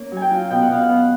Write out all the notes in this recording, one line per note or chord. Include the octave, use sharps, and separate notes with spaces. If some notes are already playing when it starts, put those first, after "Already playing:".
Already playing: A#3 C#4
F#3
G5 G#5
F4
B2 G5
F#5
B2 F5
F#5
B3